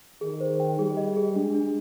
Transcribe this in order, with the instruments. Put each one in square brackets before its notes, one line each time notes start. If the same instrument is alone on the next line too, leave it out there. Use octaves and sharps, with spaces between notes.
[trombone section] D#3 [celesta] G#4
[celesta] C5
G5
[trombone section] G3 [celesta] G#4
[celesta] D#5
G#4
[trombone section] G#3 [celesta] D4
[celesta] D4